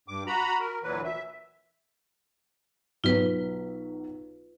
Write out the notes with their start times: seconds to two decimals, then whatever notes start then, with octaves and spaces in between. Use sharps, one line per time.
0.08 G2 D6
0.27 F#4 A#5 B5
0.60 A#4
0.83 D2 A#2 E3 F#3 B4
1.04 E5
3.04 B1 F#3 F4 B4 B6